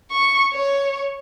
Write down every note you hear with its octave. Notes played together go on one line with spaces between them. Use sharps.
C#6
C#5